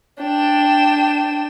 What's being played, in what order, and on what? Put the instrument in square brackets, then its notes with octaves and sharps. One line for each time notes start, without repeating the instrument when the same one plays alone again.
[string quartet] D4 [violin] G5 E7